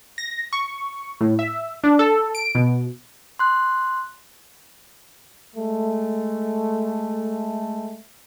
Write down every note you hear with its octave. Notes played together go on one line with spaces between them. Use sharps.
A#6
C#6
A2
E5
D4
A4
D7
B2
C6 F#6
G#3 A3